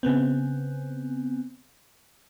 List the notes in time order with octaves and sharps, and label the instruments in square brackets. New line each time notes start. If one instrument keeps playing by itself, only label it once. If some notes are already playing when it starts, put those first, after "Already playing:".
[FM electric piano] C#3 B3 C4